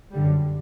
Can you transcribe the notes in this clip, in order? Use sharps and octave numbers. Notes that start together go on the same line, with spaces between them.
F#2 D3 G3